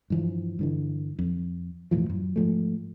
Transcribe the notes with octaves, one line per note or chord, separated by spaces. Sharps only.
G2 E3 F3
G2 D3 E3
F2
E1 A2 E3 F3
F#2
G#2 F3 A3